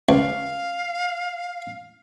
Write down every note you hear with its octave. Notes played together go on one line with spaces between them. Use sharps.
C#2 F5